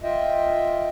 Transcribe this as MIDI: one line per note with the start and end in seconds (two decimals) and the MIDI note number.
0.03 0.89 65
0.03 0.89 75
0.03 0.89 76
0.03 0.89 79